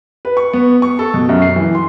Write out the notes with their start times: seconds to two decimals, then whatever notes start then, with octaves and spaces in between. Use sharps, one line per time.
0.25 B4
0.37 C#6
0.53 B3
0.82 C#6
0.99 A4
1.14 B2
1.29 F#2
1.42 C7
1.56 E3
1.75 C6